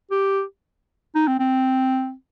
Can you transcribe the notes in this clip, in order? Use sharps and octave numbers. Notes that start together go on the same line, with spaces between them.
G4
D#4
C4
C4